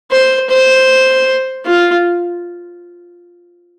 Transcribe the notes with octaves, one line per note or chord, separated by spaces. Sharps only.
C5
C5
F4